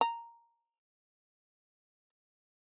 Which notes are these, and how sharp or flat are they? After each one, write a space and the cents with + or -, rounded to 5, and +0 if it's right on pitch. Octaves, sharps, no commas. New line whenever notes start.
A#5 +0